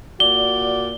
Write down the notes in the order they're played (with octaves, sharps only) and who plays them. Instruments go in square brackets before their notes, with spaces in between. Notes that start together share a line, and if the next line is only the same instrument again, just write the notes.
[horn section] A#2 F#4 D5 [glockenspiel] G7